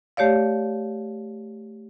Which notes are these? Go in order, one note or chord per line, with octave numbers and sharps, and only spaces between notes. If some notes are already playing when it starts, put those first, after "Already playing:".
A3 G4 C#5 D5 F5